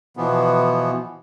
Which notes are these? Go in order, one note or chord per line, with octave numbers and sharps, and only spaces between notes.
B2 E3 F3 B3